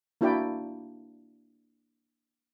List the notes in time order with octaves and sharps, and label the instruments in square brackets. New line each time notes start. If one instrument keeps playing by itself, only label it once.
[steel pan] A#3 D4 E4 F#4 D5 G5